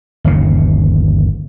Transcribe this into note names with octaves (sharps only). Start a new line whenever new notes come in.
G1 D#2 C#3